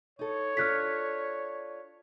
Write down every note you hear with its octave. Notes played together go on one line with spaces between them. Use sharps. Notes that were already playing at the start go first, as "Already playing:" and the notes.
D#4 A4 C#5
D4 F4 A4 F6 F#6 B6